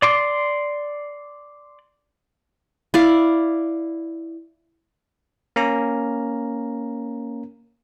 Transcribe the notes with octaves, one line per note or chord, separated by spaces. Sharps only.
D5 C6 D6
E4 D5 F5
A#3 C#4 A#5